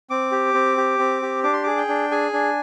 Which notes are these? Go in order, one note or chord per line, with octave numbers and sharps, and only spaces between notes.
C4 D6
G4
C4
G4
C4
G4
D4 D6
C6
G#4 D6
G5
D4
G#4 G#5
D4